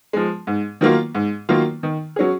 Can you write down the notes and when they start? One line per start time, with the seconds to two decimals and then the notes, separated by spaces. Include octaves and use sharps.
0.13 F3 G#3
0.47 G#2
0.81 D#3 F#3 A#3 F4
1.15 G#2
1.49 D#3 F#3 A#3 F4
1.83 D#3
2.16 F#3 C#4 G#4